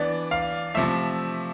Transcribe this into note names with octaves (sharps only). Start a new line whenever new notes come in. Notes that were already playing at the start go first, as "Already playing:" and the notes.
Already playing: E3 B3 D4 D5
F5
C3 F3 A3 E5